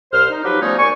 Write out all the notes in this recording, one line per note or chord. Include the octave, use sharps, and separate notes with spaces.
C2 C5 F6
D#4
F3 F#3 D#4 G4 B4
F3 G3 A3 B3 C#4 D#4
D#2 D5 G#5 C#6